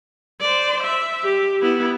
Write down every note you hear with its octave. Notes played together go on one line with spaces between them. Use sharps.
C5 D5
E5
G4
B3 E4